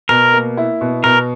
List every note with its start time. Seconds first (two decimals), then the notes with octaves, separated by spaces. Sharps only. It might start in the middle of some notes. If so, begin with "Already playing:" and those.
0.09 B2 A#4
0.34 A#3
0.57 E4
0.81 B2
1.04 B2 A#4